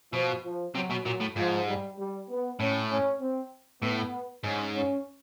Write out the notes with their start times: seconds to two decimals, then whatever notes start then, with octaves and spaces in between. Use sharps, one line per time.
0.13 B2 F3
0.43 F3
0.75 C3 F#3
0.90 B2
1.05 A#2 F#3
1.20 A2
1.36 G#2 F3
1.67 G3
1.98 G3
2.29 B3
2.59 A2 C#4
2.90 C#4
3.20 C4
3.82 A2 B3
4.44 G#2 C#4
4.75 C#4